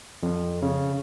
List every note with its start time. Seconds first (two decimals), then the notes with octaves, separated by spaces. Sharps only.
0.23 F2
0.62 C#3